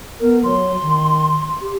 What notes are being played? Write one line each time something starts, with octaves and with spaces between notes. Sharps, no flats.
B3 A#4
F#3 C6
D#3
G4